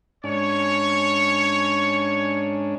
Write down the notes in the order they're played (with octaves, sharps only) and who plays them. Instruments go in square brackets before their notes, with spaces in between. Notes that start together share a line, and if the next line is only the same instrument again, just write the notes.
[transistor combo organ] G#2 C#4 D4 [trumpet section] C#5